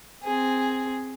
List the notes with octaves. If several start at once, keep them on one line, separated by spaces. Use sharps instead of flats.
C4 G#4